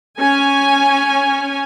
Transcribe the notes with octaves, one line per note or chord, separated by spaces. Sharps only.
C#4 G#5